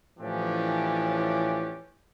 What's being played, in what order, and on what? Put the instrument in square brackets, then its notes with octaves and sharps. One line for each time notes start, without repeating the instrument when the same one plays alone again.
[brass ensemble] A2 E3 F3 C#4 D4 G4